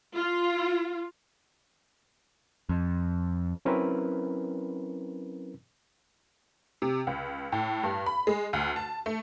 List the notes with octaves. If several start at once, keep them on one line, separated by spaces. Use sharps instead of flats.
F4
F2
F#3 C4 C#4 E4 A#4 B4
C3
C#2
A2
G2
B5
G#3
D2
A5
A3